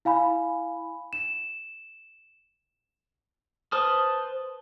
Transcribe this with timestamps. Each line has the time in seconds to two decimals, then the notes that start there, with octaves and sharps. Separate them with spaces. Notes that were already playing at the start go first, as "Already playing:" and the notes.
0.05 E4 F5 G#5 B5
1.13 E7
3.72 B4 C5 A5 D#6 F6